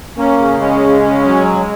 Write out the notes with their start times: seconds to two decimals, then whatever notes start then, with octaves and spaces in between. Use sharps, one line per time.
0.17 A#3 C#4
0.37 C#3
0.60 G#3 C#4
0.81 C#3
1.02 C#4
1.24 F#3